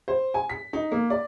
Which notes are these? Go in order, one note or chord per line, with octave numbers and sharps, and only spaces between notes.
C5
G#5
B6
D#4
A#3
D5